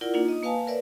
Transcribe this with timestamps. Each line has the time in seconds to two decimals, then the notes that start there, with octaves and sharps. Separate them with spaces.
0.01 E4 F4 A#4 D5 F#5
0.14 A#3 D4 D#4 F4
0.28 D#5 D#6
0.43 A#3 B4 F5 G#5 A5
0.67 A#4 B4 C#5 D5 E5